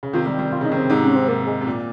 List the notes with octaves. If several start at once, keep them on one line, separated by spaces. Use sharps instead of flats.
C#3
C3 D#3 F4
D#3 G3
D#3 G3
D#3 F4
C#3 D#4
C3 D#3
C4
G#2 C3 D#4
C#4
C4
G#2 C3 A#3
G#3
C3
A#2